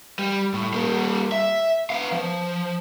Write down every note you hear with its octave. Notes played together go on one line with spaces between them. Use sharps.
G3
A2
G3 A#3
E5
B3 F5
F3